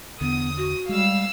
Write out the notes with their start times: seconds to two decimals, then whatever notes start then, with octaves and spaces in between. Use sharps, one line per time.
0.21 E2 D3 E3 B3 D#6
0.57 F#4
0.89 G3 G#3 F5 E6